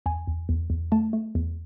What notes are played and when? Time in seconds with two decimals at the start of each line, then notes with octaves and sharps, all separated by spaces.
0.06 E2 G#5
0.27 E2
0.49 E2
0.70 E2
0.92 A3 A5
1.13 A3
1.35 E2